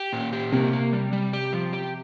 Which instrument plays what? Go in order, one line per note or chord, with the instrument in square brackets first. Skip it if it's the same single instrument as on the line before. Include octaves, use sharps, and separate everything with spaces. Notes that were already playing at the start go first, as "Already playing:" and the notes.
Already playing: [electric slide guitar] G4
A#2
G4
[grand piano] C3 [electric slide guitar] A#3
[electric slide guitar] A#3
G3
G3
G4
F3
G4